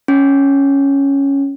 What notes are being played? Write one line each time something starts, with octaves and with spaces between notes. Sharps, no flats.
C#4